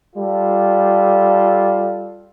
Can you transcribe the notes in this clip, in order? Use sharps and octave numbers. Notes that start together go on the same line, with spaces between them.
G3 F4 A4